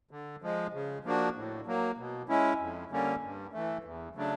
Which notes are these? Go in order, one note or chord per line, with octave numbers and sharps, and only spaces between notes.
D3
F3 G#3
C#3
F3 A#3 D4 F#4
A2
F#3 A#3
B2
G#3 C#4 E4
F2
D3 G3 A#3 C#4
G2
E3 A3
E2
C#3 F#3 A3 D4